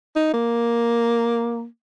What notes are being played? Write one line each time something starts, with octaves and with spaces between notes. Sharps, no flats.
D#4
A#3